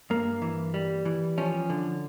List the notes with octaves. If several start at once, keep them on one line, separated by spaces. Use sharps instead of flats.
G2 A#3
E3
G3
E3
F3 C#4
D3